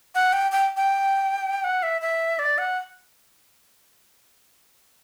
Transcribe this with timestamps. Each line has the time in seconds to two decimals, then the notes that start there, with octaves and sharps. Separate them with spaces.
0.15 F#5
0.33 G5
0.52 G5
0.77 G5
1.64 F#5
1.83 E5
2.02 E5
2.39 D5
2.58 F#5